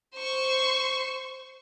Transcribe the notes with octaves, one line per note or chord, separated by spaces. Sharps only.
C5 C#6